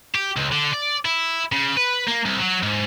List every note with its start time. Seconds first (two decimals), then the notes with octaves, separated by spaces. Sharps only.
0.15 G4
0.37 C#2
0.52 D3
0.74 D5
1.05 E4
1.52 C#3
1.77 B4
2.07 A#3
2.25 C2
2.40 F#3
2.63 G#2